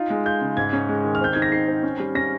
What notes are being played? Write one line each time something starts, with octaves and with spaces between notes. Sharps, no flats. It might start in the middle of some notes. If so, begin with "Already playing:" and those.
Already playing: D#4 F4
G#3
F4 G6
C#3
G#2 G#6
C#4
G#3
D#3
F6
C4 G6
D#4 G#6
A#6
D#4 C7
C4
C#4
G3
C#4 A#6